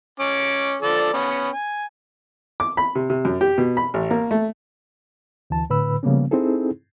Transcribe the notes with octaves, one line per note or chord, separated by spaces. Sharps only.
C#4 D6
F3 A4 D5
B3 C#4
G#5
D6
B5
C3
C3
F#2
G4
B2
B5
A1
A#3
A3
D2 E3 A5
A2 D3 B4 B5 E6
C#3 F3 G3 A#3 B3 C#4
C4 D#4 E4 G#4 A4